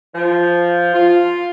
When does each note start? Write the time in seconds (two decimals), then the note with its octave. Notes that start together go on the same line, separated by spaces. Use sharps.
0.15 F3
0.95 F4